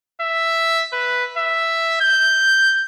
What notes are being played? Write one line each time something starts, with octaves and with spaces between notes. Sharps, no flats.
E5
B4
E5
G6